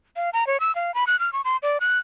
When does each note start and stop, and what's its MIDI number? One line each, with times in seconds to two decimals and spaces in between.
0.16 0.30 77
0.33 0.47 82
0.47 0.60 73
0.60 0.74 88
0.75 0.94 77
0.95 1.04 83
1.07 1.19 90
1.19 1.32 89
1.33 1.41 85
1.45 1.57 84
1.63 1.78 74
1.80 1.99 90